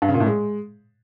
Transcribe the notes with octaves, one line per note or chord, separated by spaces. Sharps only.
G2
C#3
A#2
A2
G#3